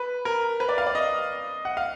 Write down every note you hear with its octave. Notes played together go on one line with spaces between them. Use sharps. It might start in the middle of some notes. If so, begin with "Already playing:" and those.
Already playing: B4
A#4
B4
D5
F5
D5
D#5
F#5
F5